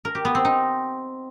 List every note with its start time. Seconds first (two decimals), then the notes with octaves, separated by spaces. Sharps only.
0.05 A#4
0.15 G4
0.25 B3
0.35 C4
0.45 D#4